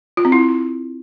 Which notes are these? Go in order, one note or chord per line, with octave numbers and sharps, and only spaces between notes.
F4
C4
E4